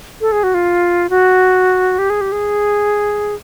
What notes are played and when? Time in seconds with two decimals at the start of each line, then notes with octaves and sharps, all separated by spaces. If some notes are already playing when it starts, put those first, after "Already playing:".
0.21 A4
0.32 G#4
0.43 F#4
0.54 F4
1.10 F#4
1.99 G4
2.10 G#4
2.21 G4
2.32 G#4